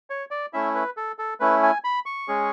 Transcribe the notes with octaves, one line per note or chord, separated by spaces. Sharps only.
C#5
D5
A3 C#4 E4 E5
B4
A4
A4
A3 C#4 E4 B4
G#5
B5
C#6
G#3 C#4 G#4